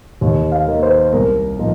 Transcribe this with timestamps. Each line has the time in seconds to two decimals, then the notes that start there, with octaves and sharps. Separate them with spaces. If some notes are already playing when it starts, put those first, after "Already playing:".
0.21 D#2
0.52 F5
0.67 D#3 A#3 D#4
0.83 C5
1.13 C2 A#4
1.59 A#2 F3 D#4